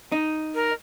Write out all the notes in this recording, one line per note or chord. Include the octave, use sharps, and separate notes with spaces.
D#4
A#4